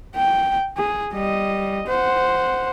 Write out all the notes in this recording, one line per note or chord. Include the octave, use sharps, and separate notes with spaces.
G5
G#4
G3 D#5
C5 F#5